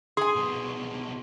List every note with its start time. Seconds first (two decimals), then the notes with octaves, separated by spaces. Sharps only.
0.17 G#4 G#5 C6
0.36 C2 B2